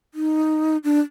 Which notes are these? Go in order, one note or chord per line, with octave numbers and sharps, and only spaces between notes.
D#4
D4